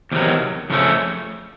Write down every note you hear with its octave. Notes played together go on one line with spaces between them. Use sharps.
E2 C3 D#3 F#3
F2 C#3 F3 A3 C#4